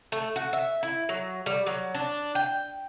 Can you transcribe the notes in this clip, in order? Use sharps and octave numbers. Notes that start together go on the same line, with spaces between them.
A3
F#4
E5
E4
F#3
G3
F#3
D4
G5